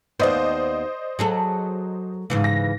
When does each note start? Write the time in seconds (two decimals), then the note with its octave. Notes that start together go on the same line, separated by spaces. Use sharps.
0.20 D#2 B3 C5 D5 D#5
1.19 F#3 G#4 A4
2.30 G#2 C#3 E3
2.44 A#6